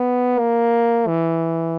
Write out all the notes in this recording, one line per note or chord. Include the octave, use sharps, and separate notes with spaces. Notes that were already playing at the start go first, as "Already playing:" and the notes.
Already playing: B3
A#3
E3